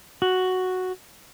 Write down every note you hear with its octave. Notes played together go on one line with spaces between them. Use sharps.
F#4